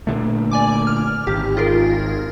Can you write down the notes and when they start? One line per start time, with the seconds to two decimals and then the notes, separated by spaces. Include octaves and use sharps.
0.07 A#2 D3 A3
0.51 D5 G#5 D6
0.87 F6
1.27 G#1 G4
1.57 F4 G#4 A#4